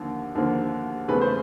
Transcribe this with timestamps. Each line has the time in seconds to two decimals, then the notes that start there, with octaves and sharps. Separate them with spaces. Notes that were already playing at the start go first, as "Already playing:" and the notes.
Already playing: D#2 D3 F3 A#3
0.35 D#2 D3 F3 A#3
1.08 E2 C#3 E3 A3 C4 B4
1.21 C5